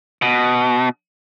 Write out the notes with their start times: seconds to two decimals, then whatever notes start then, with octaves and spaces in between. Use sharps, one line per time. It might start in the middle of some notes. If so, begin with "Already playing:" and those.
0.22 B2